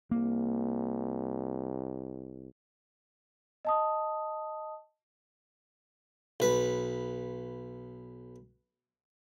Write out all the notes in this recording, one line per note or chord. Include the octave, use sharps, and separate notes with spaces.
C2 A#3
D#5 A5 D#6
B1 B4